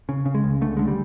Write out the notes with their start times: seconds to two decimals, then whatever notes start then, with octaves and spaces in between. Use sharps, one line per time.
0.09 C#3
0.26 C#3
0.35 G#3
0.44 C#2
0.61 D3 A3
0.77 D3 G#3
0.88 G3